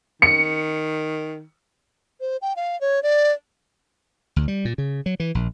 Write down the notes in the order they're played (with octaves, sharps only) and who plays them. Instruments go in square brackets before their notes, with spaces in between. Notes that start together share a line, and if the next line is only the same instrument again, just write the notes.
[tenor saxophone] D#3 [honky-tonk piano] C#7
[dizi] C5
G5
F5
C#5
D5
[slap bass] D2
G3
A#2
C#3
F#3
E3
A#1